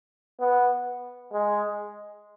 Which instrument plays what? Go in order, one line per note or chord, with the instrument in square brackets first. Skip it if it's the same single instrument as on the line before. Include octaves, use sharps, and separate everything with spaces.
[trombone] B3
G#3